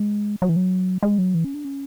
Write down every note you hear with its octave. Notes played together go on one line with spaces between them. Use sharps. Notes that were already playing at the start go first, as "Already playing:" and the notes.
Already playing: G#3
F#3
E3
F#3
G#3
F#3
E3
C#4
D4
C#4